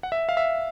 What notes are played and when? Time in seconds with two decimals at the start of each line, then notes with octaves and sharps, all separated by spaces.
0.03 F#5
0.12 E5
0.29 F5
0.37 E5